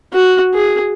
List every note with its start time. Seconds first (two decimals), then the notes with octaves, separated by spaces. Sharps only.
0.13 F#4
0.54 G#4